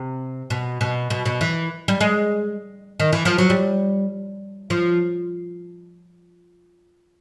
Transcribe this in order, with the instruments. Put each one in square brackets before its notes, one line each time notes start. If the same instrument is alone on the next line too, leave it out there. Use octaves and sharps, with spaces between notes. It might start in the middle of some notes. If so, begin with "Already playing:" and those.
Already playing: [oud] C3
B2
B2
B2
B2
E3
G3
G#3
D#3
E3
F3
F#3
G3
F3